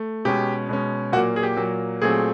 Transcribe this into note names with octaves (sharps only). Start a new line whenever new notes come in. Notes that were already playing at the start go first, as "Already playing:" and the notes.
Already playing: A3
B2 G#3 C#4 G4
B2 G#3 C#4
A#2 F#3 A#3 F#4
G#4
G4
A#2 F#3 A#3
A#2 F#3 A3 C4 G#4